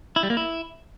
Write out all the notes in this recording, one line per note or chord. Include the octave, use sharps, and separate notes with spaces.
E4
G3
A#3
E4